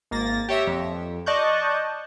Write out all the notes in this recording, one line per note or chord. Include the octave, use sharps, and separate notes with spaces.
G#1 A#3 A6 A#6
G4 C#5 E5 A#6
F2
D5 D#5 A5 C#6 F#6 G6